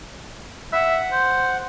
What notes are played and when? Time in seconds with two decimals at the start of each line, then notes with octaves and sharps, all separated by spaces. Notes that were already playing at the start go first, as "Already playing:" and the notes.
0.73 E5 F#5
1.12 C5